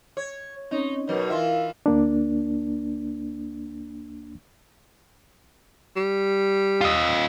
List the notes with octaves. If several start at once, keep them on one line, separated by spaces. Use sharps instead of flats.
C#5
C4 C#4 D#4 C#5
B2 F#3 D#4 A#4 B4 C#5
E3 E4 F4 A#4 E5 F5
D2 A#3 D4
G3
F4 D#5